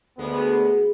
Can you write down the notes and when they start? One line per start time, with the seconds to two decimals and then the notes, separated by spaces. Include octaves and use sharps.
0.19 D2 G#3 B3